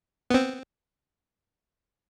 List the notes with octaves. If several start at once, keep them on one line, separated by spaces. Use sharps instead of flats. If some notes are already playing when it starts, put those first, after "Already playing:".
B3 C4